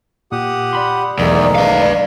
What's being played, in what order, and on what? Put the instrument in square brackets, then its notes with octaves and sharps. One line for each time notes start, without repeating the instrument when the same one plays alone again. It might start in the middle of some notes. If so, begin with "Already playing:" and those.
[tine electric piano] A#2 [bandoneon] G4 F#5 D#6
[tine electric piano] D5 B5 C6
[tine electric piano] B1 A3 [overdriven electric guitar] E2 [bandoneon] G#2 D#3 [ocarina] D5
[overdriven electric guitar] B4 F5